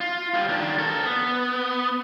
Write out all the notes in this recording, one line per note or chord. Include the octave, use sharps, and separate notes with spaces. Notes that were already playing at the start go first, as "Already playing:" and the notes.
F4
G3 F4
D#3 D4
A4 A#4
B3